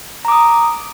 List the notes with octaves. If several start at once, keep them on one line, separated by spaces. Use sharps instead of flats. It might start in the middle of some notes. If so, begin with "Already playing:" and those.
A#5 D6 D#6